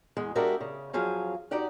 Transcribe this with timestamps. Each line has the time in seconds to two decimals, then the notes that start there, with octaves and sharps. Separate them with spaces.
0.17 E2 G#3
0.35 G#3 D4 F#4 G4 A#4 E5
0.60 C#3
0.93 F2 F3 F#3 G#4 F5
1.51 D#4 F#4 G4 D5 F#5